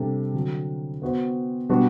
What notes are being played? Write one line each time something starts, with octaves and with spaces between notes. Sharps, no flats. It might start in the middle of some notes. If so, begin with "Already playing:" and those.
Already playing: C3 G3 D4 A4
D3 F#3 C4
B3 F#4 C5
B2 G3 B3 D4 F#4